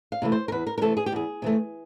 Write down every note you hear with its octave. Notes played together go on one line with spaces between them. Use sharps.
F5
C3 E3 A3
C5
A#4
E2 B4
A#4
A#4
C3 E3 A3 A4
G#4
G4
E2 G#4
C3 E3 A3